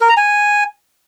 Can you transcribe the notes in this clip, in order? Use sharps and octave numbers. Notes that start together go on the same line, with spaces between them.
A#4
A#5
G#5